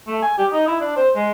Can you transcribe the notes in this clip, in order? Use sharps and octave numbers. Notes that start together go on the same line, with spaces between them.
A3
G#5
G4
D#4
E4
D4
C5
G#3